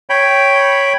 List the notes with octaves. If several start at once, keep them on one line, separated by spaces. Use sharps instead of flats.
C#5 G5 B5